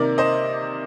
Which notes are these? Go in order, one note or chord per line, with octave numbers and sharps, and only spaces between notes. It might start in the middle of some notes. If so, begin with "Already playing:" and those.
Already playing: C3 D#3 A#3 A#4 D5
C5 D#5